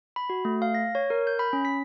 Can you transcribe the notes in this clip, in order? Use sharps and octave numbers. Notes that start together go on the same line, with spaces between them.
B5
F#4
A3
F5
A#6
C#5
A#4
G6
B5
C#4
B6